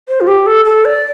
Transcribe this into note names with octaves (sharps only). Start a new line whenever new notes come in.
C5
F4
G4
A4
A4
D5